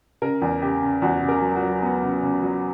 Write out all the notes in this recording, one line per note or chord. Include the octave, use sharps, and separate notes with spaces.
C#3 A#4
E2
C#3 G4
C#3
E2 F#4
C#3
A#4
F#3
F#4
F#3
B3
C#3
C#3
F#3